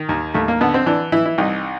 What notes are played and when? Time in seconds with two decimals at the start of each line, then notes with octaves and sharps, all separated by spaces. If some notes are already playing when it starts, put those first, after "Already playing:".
Already playing: D#3
0.09 D#2
0.34 D#2 A3
0.48 A#3
0.61 D3 B3
0.74 C4
0.86 E3 D4
1.12 E3 E4
1.26 E4
1.38 C2 D#4